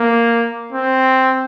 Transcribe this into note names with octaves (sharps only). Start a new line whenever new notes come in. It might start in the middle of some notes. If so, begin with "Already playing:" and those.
Already playing: A#3
C4